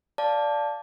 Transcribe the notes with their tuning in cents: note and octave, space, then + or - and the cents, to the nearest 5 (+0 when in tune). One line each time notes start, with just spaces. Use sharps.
D5 -10 F5 +0 A5 -5